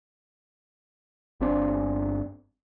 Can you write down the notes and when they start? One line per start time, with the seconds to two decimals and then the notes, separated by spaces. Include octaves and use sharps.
1.41 G1 G2 C4 D4